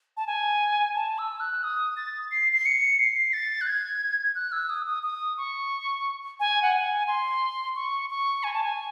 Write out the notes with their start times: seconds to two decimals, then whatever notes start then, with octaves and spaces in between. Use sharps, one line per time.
0.17 A5
0.27 G#5
0.95 A5
1.18 E6
1.40 F#6
1.63 D#6
1.97 A6
2.31 C7
2.53 C7
2.66 C#7
2.99 C7
3.33 A6
3.61 F#6
3.67 G#6
4.35 F#6
4.52 E6
4.70 D#6
4.87 D#6
5.03 D#6
5.38 C#6
6.40 G#5
6.62 F#5
6.73 G#5
7.08 C6
7.76 C#6
8.10 C#6
8.43 G#5
8.53 A5
8.64 G#5